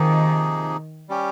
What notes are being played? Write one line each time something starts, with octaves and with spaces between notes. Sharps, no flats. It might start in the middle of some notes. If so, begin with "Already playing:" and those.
Already playing: C3 D#3 F3 A#3 D#4 G#4
G3 C#4 G4